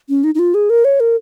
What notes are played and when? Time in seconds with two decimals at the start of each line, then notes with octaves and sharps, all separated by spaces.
0.09 C#4
0.24 D#4
0.35 D#4
0.39 F4
0.54 G#4
0.70 A#4
0.85 C#5
1.00 A#4